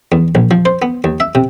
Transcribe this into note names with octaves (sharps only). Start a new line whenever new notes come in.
E2
A#1
F3
C5
B3
D#2
E5
C3